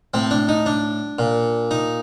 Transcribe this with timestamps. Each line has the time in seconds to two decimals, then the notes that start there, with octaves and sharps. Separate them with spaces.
0.14 A2 C4
0.31 D4
0.49 D#4
0.66 D4
1.19 A#2
1.71 D#4